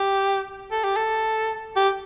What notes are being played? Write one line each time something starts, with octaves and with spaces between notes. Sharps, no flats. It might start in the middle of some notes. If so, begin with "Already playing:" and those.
Already playing: G4
A4
G4
A4
G4